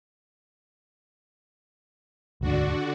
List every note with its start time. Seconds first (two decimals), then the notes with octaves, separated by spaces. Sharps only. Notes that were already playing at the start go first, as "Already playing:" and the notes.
2.41 E1 D2 G#2 D3 D4 F#4